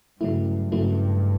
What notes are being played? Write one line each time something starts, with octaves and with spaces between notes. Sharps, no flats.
G2 C#3 F#3 A3 E4
G2 C#3 F#3 A3 E4